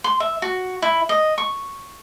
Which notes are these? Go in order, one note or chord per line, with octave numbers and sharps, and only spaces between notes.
C6
E5
F#4
E4
D#5
C#6